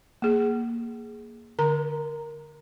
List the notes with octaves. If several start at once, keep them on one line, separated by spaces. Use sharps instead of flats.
A#3 G#4
D3 A#4 A#5